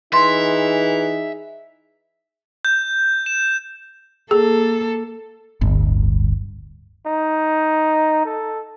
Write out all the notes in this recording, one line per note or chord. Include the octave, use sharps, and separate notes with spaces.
E3 D#4 G#4 E5 C6
G6
E7
A#3 G#4 A4
D1 G1
D#4
A4